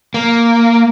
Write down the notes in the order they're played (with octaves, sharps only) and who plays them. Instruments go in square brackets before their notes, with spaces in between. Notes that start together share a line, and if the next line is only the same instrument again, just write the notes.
[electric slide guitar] A#3